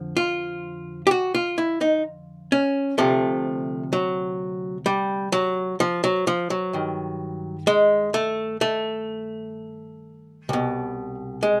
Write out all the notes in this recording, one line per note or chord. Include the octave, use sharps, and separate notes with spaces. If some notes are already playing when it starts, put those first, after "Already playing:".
Already playing: F2 D3 F3
F4
G4
F#4
F4
E4
D#4
C#4
D2 C3 F3 A3
F#3
G3
F#3
F3
F#3
F3
F#3
G2 D#3
G#3
A3
A3
C2 B2
G#3